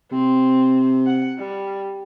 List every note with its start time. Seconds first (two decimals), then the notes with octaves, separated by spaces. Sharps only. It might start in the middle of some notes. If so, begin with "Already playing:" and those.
0.12 C3 C4
1.07 F#5
1.38 G3